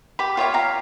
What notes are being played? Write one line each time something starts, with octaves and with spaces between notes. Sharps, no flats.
G4 B5
F4 C#5 E5 G5
F5 A#5